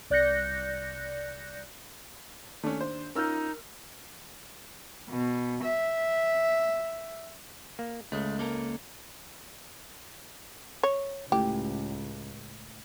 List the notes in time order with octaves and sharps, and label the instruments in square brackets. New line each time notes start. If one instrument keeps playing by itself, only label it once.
[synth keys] C2 D5 F#6 G6 A#6 C#7
[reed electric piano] D#2 D4 [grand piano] A3 C#4
[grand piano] C5
[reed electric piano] C#4 F4 G6 [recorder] D#4 [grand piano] A#4 E6 F6
[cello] B2
E5
[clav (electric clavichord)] A#3
[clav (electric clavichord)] C#2 [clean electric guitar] G#3 A3
[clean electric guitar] A#3 A4 A#4
[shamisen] C#5
[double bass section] C#2 [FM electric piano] A2 [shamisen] G4